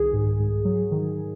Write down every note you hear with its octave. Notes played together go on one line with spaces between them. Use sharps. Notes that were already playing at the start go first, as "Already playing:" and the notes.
Already playing: C2 D#3 G#4
G#2
G#2
F#3
D#3